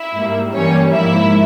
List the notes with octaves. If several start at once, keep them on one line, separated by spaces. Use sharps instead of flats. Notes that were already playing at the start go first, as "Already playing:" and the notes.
Already playing: E4 E5
G#2 G3 A#3
G2 E3 G3 A#3 C#4 C#5
G#2 F3 A#3 E4 E5